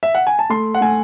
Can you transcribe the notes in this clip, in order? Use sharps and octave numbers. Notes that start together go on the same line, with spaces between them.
E5
F#5
G#5
A5
A3 C6
F#5
A3 G#5